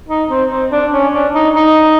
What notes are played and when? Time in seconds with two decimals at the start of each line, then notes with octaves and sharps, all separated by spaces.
0.09 D#4
0.29 C4
0.51 C4
0.72 D4
0.92 C#4
1.14 D4
1.35 D#4
1.56 D#4